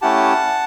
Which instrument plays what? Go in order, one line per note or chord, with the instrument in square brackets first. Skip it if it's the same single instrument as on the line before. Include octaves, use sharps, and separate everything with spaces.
[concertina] A3 C#4 E4 G4 F#5 A5